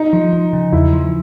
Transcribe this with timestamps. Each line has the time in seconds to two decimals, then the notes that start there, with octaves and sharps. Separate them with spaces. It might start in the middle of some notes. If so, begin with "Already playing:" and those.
Already playing: D#4
0.13 F3
0.33 F3
0.53 C#3
0.72 E2 E4
0.93 F3